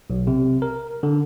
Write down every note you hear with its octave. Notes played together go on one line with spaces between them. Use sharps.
B1
C3
A#4
D3